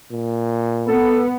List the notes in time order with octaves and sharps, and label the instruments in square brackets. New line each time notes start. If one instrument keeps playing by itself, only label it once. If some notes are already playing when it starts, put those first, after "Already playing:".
[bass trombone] A#2
[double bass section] B3 [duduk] A4